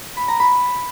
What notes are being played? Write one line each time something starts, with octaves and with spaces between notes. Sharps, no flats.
B5
A#5
B5